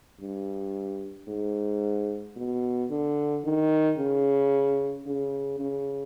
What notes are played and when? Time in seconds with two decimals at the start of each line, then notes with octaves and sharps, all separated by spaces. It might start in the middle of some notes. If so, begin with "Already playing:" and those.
0.21 G2
1.28 G#2
2.36 B2
2.90 D3
3.44 D#3
3.98 C#3
5.06 C#3
5.60 C#3